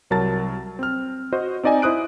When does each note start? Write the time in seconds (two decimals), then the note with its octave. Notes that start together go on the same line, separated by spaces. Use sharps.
0.10 C2 F#3 A#4 A5 A6
0.79 C4 F6
1.32 F#4 C5 D#5
1.63 C4 D#4 D5 D#5 G#5
1.82 E4 C5 D#6 F#6 D7